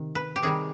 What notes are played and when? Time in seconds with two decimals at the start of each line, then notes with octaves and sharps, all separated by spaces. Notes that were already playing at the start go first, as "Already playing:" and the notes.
Already playing: C3 D#3
0.15 B4
0.36 G4
0.43 C3 D#3 G3 G#4